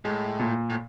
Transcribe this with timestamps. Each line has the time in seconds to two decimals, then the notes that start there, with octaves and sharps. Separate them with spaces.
0.05 A2 G#3
0.40 A#2
0.70 A2